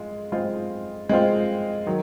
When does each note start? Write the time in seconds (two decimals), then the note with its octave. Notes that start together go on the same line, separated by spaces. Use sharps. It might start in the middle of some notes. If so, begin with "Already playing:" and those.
Already playing: G#3 F4
0.32 G#3 C4 F4
1.09 G#3 C4 F4
1.86 D#3 F#3